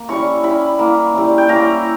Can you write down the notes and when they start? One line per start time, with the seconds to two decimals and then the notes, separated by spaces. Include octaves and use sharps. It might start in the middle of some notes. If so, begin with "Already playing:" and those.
Already playing: A#3
0.09 G3 C#4 E4 C#6
0.43 G3 C#4 E4 B5
0.79 A#3 E4
1.14 G3 C#4 E4
1.38 G5
1.48 A#3 C#4 E4 A#5